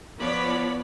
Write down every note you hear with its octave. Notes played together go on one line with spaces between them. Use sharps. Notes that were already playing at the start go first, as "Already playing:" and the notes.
F3 B3 C#5 D5 B5